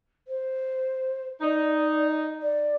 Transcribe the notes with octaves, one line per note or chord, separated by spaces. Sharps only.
C5
D#4 D5
D5